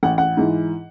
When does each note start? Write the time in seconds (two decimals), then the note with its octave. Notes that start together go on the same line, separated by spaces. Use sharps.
0.03 A1 F#5
0.18 F#5
0.37 G#2 E3